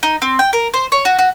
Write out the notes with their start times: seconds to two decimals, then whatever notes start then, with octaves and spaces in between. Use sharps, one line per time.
0.03 D#4
0.22 C4
0.39 G5
0.53 A#4
0.74 C5
0.92 C#5
1.05 F#4
1.19 F#4